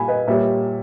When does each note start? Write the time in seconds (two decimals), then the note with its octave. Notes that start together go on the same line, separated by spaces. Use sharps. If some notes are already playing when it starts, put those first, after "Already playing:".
Already playing: A#2 G3 G#5 B5
0.08 B4 D#5
0.27 A#2 G3 C#5 E5